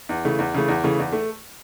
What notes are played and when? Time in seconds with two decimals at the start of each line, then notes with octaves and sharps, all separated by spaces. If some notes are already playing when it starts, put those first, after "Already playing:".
0.09 E2
0.24 C#3 E3 A3
0.39 E2
0.54 C#3 E3 A3
0.68 E2
0.84 C#3 E3 A3
0.99 E2
1.12 A3